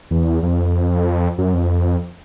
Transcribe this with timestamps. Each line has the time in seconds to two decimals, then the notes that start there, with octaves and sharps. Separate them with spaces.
0.11 E2
0.43 F2
1.38 F#2
1.54 F2